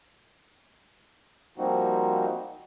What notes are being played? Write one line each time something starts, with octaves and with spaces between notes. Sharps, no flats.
F3 G3 A#3 C4 D#4 F#4